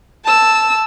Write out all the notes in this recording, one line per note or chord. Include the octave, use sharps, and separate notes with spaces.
A5 E6